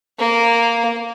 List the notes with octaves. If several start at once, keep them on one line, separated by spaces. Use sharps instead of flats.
A#3